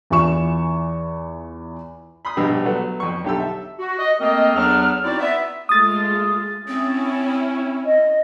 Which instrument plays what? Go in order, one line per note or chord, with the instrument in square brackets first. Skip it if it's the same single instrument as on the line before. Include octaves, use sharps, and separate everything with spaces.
[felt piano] E2 E3 F4 C#6 E7
[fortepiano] B5 C6 D#6
A#1 G2 B2 G4 B4 E6
F#3 A3 B3
F2 C#6
B1 D3 G4 A4 E6
E5
[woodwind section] F#4
D#5
A3 A#3 C4 A#4 D#5
E2 F#3 B3 D4 A4 F6
C4 D#4 E4 F#4 D5
B3 E5
[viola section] G#3 A3 F4 [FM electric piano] D#6 A6
[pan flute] C4 [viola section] C#4 E4
[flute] D#5